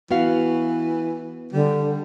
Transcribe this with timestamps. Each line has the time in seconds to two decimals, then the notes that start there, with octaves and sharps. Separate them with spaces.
0.11 E3 B3 F#4 F5
1.53 D3 G3